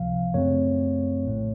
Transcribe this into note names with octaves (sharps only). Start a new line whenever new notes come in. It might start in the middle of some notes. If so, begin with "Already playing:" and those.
Already playing: C#2 C3 F3 F5
F#2 C#3 A3 C4 C#5
A#1 A2 A3